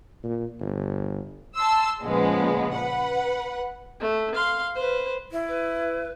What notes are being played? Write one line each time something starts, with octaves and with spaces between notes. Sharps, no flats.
A#2
G1
A5 C6 E6
A#2 C#3 F3 G#3 B3
B4 F#5
A3
F5 C6
B4 C5
E4
B4